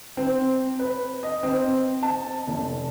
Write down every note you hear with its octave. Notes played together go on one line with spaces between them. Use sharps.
C4
B4
D#5
C4
A5
F1